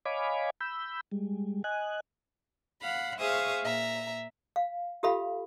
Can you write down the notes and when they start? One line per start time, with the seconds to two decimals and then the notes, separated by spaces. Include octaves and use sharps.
0.06 C#5 D#5 F5 G#5 B5 D6
0.61 B5 E6 G6
1.12 G3 G#3
1.64 D#5 G#5 F#6
2.82 F5 F#5 B5
3.19 G#4 C5 E5 F5 C#6 D#6
3.63 A#2 E5 A#5
4.56 F5
5.03 F4 G4 A4 E5 F5 B5